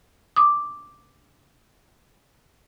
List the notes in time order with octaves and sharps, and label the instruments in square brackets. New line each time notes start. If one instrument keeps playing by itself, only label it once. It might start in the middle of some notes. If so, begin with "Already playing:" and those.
[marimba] D6 D#6